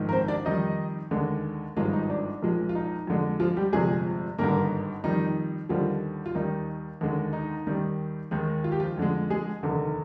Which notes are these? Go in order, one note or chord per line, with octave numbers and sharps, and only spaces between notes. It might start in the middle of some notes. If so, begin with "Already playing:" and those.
Already playing: A#1 G#2 D#3 G#3
A#4
C4 C5
D4 D5
F2 D#3 G3 D#4 D#5
D#2 D3 G#3
G#1 G2 F3 G#3 F4
D#4
D4
A#1 A#2 F3 G#3
F4
D#4
F2 D3 G#3
F3 F4
G3 G4
G1 F2 C3 F3 G#3 G#4
G#1 G2 D3 A#3 A#4
F2 D#3 G3 D#4
D#2 D3 F3 G3 F4
F4
D#2 D#3 G3 D#4
D#2 D3 G#3
D#4
D#2 D#3 G3
D#2 D#3 G#3
F4
G4
F3 F4
F2 D3 G#3
G#3 G#4
F1 D#2 D3